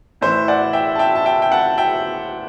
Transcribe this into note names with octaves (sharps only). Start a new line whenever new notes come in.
A2 E3 C5 E5
D5 F#5
E5 G5
A5
E5 G5
A5
E5 G5
G5
F#5 A5
E5 G5